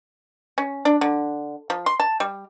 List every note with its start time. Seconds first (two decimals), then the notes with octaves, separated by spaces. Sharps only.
0.58 C#4
0.85 D4
1.01 D3
1.70 F3
1.86 C6
2.00 A5
2.20 G3